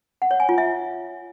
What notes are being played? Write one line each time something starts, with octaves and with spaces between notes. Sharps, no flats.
F#5
C#5
G#5
F4
E5